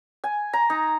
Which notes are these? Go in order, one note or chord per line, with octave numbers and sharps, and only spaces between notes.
G#5
A#5
D#4